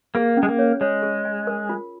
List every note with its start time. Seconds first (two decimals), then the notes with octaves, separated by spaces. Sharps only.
0.15 A#3 G#4
0.37 C#4
0.43 G#3
0.48 A#3
0.59 C#5
0.81 G#3 C#5
1.03 G#4
1.25 G#5
1.47 A#4
1.69 F4